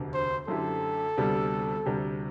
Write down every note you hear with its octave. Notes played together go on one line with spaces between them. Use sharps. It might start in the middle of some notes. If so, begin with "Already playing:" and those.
Already playing: E1 D2 C3
C5
F#2 D3 A3 E4 G4 A4
D2 C3 G3 B3
D2 C3 G3